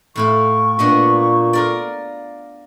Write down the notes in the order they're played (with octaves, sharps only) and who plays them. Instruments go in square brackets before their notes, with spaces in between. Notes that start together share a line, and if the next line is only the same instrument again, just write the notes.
[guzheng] A2 E4 F4 [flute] C#6
[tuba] A#2 [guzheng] B3 D4 D#5
[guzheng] F4 A#4 D5